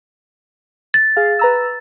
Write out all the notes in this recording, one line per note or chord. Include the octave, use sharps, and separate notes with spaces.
A6
G#4 F5
B4 A#5 E6